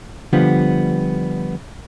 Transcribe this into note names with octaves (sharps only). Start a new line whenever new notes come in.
D3 F3 G3 B3